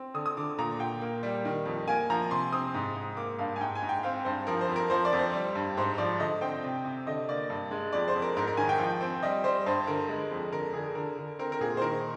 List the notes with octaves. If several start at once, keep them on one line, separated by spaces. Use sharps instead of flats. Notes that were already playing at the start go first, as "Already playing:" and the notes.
Already playing: C4
D3 D#6
D#6
D3 D6
A#2 A#5
A#2 G5
A#3
G3
D#3
F2
A#3 G#5
F3 A#5
C3 C6
C4 D#6
G#2
G#2
A#3 D6
G2 F5
G#5
G#2 G5
G#5
G#2
G5
C4 F5
G2 C5
F3 A#4
C5
F2
A#4
F3 C5
D5
F2
C5
G3
G2
G#2 C5
F3 D5
D3 D#5
C4 G5
C3
C3
D3 D#5
A#3 D5
G2
G#3
F2 D5
C5
F2
A#4
G#2 A#4
A#4
D#3 G#5
G5
F3
C4
G3 D#5
G3 C5
G2 C5
D3 A#4
G#3
F2
D3 A#4
D3 G#4
D3 A#4
D3
C4 A#4
A#4
A#2 G#4
C5
D#3 A#4